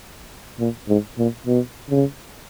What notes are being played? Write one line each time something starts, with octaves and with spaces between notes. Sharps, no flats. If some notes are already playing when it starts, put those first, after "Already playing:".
A#2
G#2
A#2
B2
C#3